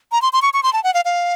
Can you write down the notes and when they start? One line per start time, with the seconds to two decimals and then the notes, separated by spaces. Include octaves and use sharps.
0.12 A#5
0.22 C6
0.33 C6
0.42 C#6
0.54 C#6
0.63 C6
0.73 A5
0.84 F#5
0.94 F5
1.05 F5